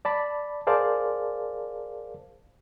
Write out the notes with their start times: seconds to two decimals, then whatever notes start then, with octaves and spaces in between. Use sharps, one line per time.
0.05 D5 A5 B5
0.67 G#4 A#4 C5 D5 F5 A5